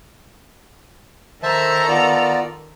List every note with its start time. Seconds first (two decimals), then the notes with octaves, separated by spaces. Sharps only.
1.43 D#3 A4 C5 E5 A5 A#5
1.88 B3 F4 D5